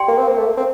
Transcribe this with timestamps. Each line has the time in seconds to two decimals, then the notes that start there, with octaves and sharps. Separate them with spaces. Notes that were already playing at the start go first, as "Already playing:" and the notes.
Already playing: G4 D5 G5 C6
0.08 A#3
0.18 C4
0.28 A#3
0.38 A3
0.47 A#3
0.57 C4